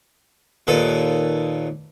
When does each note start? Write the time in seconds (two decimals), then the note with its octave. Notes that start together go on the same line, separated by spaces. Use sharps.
0.67 D#2 A#2 A4 B4